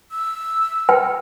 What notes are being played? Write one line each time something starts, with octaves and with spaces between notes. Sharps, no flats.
E6
B4 G5